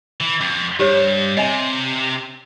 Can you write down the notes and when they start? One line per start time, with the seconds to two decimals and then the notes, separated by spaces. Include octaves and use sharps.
0.21 E3
0.41 F2 D6
0.79 G2 G4 C5 C#5
1.37 C3 D#5 E5 G#5